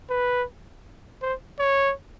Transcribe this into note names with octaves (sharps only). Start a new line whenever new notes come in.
B4
C5
C#5